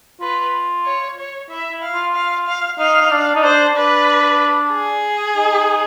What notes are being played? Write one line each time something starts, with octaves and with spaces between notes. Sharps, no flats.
F4 B4
C#5
C#5
E4 E5
E4
F5
F4
F5
F5
D#4 F5
D#4
D4
D#4
D4 C5
D4 B4
G#4
D#4